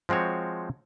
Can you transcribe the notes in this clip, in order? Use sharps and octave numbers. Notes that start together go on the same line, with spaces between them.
F3 G#3 C4 F#4 C#5